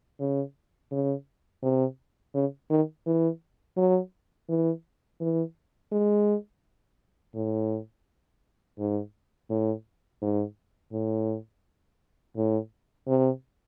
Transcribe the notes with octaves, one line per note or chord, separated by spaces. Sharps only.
C#3
C#3
C3
C#3
D#3
E3
F#3
E3
E3
G#3
A2
G#2
A2
G#2
A2
A2
C3